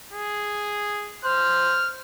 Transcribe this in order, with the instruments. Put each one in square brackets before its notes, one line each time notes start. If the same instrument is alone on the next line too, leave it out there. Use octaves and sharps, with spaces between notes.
[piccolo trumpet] G#4
[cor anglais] C5 [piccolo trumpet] F6